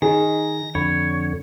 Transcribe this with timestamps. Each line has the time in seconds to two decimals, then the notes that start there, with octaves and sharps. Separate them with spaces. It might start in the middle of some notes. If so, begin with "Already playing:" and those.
0.02 D#3 D#4 G#4 A#6
0.75 F2 D3 C#5 B5